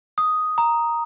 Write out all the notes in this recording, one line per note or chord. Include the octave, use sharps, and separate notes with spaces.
D#6
A#5